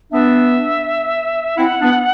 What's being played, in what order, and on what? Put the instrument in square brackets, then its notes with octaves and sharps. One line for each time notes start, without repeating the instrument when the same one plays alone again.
[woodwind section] B3 D4 [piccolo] E5
[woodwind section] C4 E4 [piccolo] F#5
[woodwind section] B3 D4